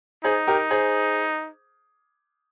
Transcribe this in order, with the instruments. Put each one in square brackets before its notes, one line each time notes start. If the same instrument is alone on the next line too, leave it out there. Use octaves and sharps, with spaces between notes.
[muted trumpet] D#4 [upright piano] G#4 C5
[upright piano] G4 A#4
G#4 C5